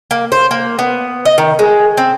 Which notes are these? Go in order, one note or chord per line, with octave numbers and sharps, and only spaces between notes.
A#3
C5
A#3
B3
D#5
D#3
G#3
C4